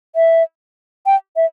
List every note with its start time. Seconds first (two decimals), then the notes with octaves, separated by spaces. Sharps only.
0.16 E5
1.06 G5
1.36 E5